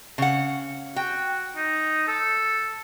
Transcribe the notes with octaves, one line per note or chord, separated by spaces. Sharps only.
C#3 F#5
F#4 G5
D#4
A4